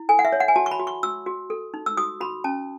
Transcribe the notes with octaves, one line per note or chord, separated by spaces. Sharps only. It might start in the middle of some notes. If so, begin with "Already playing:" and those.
Already playing: E4
A4 G#5
F#5
E5
C#5
F#5
G#5
F#4 A5
C#6
B5
F#4
C#6
F#4 E6
F#4
A4
D#4
E6
F#4 D#6
F#4 B5
C#4 A5